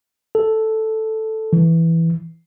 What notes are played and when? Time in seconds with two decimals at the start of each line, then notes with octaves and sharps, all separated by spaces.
0.35 A4
1.53 E3